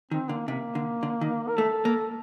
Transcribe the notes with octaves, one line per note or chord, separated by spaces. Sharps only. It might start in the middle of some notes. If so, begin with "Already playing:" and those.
D#3 C4
D3 A#3
C3 A#3
D3
D3
D#3
A#4
A3 A4
A#3